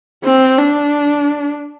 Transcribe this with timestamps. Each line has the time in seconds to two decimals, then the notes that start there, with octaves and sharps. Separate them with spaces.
0.24 C4
0.58 D4